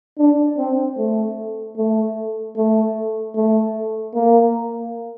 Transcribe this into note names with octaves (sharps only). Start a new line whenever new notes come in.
D4
C4
A3
A3
A3
A3
A#3